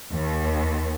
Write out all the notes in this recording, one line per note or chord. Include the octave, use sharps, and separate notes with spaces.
D#2